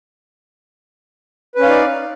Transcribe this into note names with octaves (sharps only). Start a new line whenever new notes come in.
C#4 D#4 B4 D5 F5